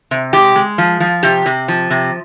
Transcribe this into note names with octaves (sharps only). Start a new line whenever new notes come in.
C3
G#3 G4
G#3
F3
F3
C3 G4
C3
F3
C3